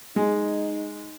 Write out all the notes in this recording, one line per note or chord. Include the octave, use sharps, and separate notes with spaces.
G#3 D#4